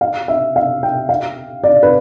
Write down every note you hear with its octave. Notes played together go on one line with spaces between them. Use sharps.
F5
E5
F5
G5
F5
D5
B4